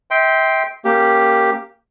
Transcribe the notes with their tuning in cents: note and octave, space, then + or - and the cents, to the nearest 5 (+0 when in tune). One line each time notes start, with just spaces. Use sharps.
E5 -35 G5 +0 C6 +0
A#3 -5 C#4 -15 G4 +0